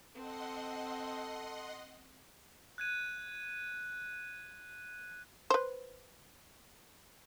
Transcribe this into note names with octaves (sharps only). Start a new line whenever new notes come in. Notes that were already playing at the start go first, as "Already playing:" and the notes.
C4 A4 D#5 F#5 C6
F#6 G#6 D#7
B4 C5